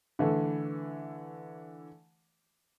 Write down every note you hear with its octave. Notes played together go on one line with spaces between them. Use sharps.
D3 E3 A3